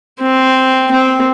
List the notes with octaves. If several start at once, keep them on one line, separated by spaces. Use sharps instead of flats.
C4
C4